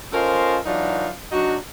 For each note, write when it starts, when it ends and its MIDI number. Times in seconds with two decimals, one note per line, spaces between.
0.13 0.57 61
0.13 0.57 65
0.13 0.57 69
0.13 0.57 70
0.13 0.57 72
0.13 0.57 75
0.65 1.07 52
0.65 1.07 54
0.65 1.07 62
0.65 1.07 63
0.65 1.07 65
0.65 1.07 66
1.31 1.55 54
1.31 1.55 62
1.31 1.55 63
1.31 1.55 66